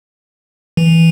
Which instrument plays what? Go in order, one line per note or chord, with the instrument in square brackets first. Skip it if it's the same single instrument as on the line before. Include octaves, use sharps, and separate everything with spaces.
[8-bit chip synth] E3